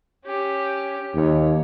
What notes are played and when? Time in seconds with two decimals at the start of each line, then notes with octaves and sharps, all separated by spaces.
0.25 C#4 G4
1.15 D#2 C#5